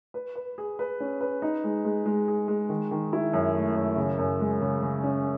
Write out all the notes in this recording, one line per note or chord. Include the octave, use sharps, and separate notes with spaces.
B4
B4
G#4
B4
C#4
B4
D#4
G#3
G#3
G#3
G#4
G#3
D#3
D#3
E4
F#2
A3
F#2
C#3
F#2
G#3
C#3
C#3
C#4